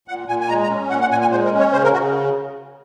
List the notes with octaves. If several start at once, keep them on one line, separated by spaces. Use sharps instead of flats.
A#2 F#5
A#2 G#5
G#5
G#3 A#5
A#5
C#4
A#2 F#5
F#5
A#2 G#5
G#5
G#3 C5
A#4
C#4
C#5
C#3 C5
A#4
C#3 F#4